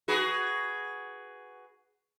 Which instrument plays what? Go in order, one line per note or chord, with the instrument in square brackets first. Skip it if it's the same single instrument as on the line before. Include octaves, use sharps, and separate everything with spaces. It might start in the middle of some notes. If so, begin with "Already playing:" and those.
[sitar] F#4 G#4 B4